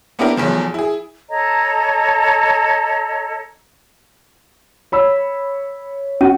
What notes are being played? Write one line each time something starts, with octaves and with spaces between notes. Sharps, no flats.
A#3 B3 D4 E4 G4 A#4
B1 E2 F3 A3
E4 G#4
A4 C#5 D#5 A#5
C#5 B5 E6
C#4 F#4